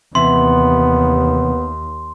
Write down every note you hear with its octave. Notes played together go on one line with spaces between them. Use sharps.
D#2 C3 E3 B3 E5 C6